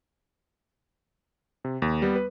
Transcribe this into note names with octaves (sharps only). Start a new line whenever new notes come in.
C3
D#2
G3 B3
B4